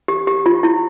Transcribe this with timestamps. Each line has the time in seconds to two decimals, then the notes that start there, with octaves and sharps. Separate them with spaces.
0.08 G4
0.27 G4
0.46 F4
0.63 E4